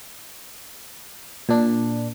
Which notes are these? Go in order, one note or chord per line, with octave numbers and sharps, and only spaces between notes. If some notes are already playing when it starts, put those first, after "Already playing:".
A#2 D4